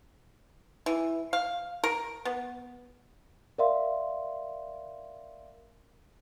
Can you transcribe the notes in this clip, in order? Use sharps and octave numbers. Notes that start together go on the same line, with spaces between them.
E3
F5
A#4
B3
A#4 D5 E5 F5 C6